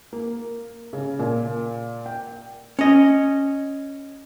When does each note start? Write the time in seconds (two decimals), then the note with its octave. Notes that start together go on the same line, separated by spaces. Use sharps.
0.13 A#3
0.93 C#3
1.19 A#2
2.06 G5
2.79 C#4 D#5